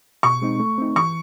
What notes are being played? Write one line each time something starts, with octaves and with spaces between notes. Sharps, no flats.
B2 C#6
G#3 C4 D#4
A3
C4 D#4
E3 C#6